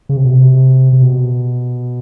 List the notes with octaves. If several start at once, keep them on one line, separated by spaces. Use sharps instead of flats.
C#3
C3
B2
C3
C3
B2